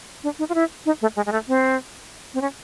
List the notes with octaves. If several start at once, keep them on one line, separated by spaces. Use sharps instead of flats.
D4
D#4
F4
E4
D#4
A3
G#3
G#3
A3
C4
C4
C#4